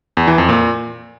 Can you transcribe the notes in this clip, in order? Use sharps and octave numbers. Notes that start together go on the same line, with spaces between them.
E2
E3
F2
A#2